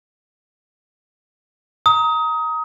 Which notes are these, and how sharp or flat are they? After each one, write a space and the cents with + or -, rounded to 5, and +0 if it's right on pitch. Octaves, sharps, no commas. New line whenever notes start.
A#5 +0 D#6 +25